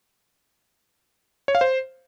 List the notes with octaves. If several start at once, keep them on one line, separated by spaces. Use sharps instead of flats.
C#5
F5
C5